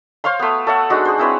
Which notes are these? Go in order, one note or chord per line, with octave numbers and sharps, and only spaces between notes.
C5 C#5 F5 C6
A3 B3
A4 C#5 E5 F#5
G#3 D4 D#4 F#4
G#4 C5
C4 E4 B4 C#5